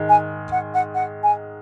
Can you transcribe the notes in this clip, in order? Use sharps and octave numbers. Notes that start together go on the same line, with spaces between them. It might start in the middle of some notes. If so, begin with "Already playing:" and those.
Already playing: G#2 D#3 G#3
G#5
F#5
F#5
F#5
G#5